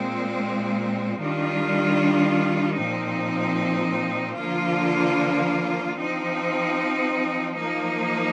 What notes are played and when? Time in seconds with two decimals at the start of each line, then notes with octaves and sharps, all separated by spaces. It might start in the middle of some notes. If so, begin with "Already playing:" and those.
Already playing: A#2 G#3 C4
1.18 D#3 G3 D4 F4
2.77 A#2 F3 C4 D#4
4.37 D3 F3 A#3 F4
5.97 F3 C4 D#4
7.56 F3 A#3 D#4